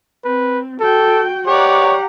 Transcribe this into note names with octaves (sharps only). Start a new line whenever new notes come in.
C4 B4
F#4 A4 G5
G4 C#5 D5 F#5 A#5